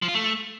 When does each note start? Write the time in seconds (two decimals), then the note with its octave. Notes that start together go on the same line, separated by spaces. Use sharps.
0.02 F3
0.08 F4
0.14 A3